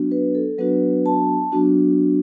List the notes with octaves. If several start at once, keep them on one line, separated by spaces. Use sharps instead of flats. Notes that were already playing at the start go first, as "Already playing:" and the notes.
Already playing: F#3 B3 D4 F#4
B4
A4
F#3 B3 D4 F#4 B4
A5
F#3 B3 D4 F#4